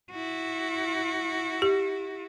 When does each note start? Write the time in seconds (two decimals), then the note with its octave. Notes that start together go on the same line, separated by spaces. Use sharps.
0.11 E4 F#4
1.62 G4